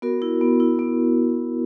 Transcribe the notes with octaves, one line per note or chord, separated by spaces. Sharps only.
B3 F#4 A#4
E4
B3
E4
B3